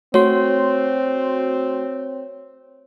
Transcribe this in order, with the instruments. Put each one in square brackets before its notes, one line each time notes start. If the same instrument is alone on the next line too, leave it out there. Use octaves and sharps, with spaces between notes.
[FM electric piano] A3 F#4 C6 [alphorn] C4 [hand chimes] C#5